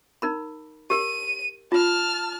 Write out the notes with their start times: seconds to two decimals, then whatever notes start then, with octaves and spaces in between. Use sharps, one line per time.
0.22 D#4 A#4 B5
0.90 G4 A#4 D#7
1.72 F4 A5 F6